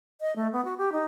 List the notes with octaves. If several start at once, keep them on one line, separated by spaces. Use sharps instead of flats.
D#5
A3
B3
F#4
G4
D#4